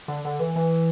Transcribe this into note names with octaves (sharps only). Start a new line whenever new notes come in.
D3
D3
E3
E3